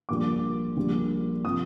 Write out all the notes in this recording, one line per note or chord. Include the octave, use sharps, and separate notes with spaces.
A#1 A#2 G3 D6
A#1 A#2 G3
C3 F3 D#6